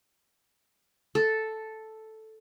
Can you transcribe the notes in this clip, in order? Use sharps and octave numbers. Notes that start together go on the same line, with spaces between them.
A4